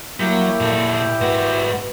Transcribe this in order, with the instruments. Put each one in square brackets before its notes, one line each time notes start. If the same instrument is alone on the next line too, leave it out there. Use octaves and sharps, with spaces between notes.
[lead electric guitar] F#3 [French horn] A#3 [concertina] E4 G4 G5
[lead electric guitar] A#2 A4
[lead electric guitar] G#2 F#4 [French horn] B4